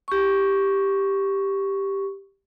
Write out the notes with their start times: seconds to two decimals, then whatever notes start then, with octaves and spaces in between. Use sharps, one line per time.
0.08 G4 C#6